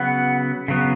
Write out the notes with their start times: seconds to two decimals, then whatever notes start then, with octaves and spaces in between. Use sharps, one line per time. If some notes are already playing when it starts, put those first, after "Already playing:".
Already playing: C#3 F#3 B3 F#5
0.68 C#3 F#3 B3